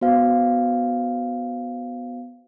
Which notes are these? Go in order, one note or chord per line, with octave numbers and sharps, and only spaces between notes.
B3 F#4 C5 F5